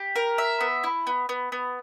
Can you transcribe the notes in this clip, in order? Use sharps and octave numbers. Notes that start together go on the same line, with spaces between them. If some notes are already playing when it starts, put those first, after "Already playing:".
Already playing: G4
A#4
E5
B3
E4
B3
B3
B3